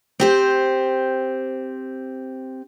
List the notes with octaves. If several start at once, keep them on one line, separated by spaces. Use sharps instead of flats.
C4 G4 C5